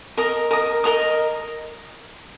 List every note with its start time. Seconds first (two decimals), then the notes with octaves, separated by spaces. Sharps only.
0.17 A#4 D#5 A#5 D#6
0.51 A#4 D#5 A#5 D#6
0.84 A#4 D#5 A#5 D#6